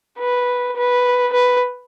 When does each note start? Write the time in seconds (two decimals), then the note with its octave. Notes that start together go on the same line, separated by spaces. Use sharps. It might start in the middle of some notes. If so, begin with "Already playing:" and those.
0.19 B4
0.76 B4
1.33 B4